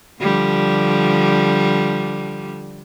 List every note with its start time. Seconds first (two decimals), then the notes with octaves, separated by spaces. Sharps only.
0.20 D3 F3 G3